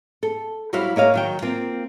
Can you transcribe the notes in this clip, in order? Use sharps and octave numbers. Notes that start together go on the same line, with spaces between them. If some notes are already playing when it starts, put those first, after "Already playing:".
A4
F#3 G3 E4 F#4 C5 F5
A#3 C#5 D#5 F5
D#3 F#3 G5
A#3 C4 F4